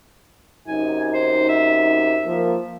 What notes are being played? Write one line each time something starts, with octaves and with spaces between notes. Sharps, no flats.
F#2 C3 D#4 G#5
C5
E5
F3 A#3